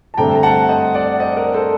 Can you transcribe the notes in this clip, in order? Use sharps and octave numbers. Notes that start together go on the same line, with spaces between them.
A5
G2 D3 A3 C4 G5 A#5
A#5
F#5 A5
C5 D#5
D5 F#5
C5 D#5
A#4 D5
A4 C5